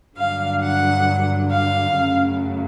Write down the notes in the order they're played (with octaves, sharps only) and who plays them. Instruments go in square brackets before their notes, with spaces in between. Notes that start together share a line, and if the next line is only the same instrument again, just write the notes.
[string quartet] G2 D3 F#3 F5
F#5
F5
F#2 C#3 F#3 A3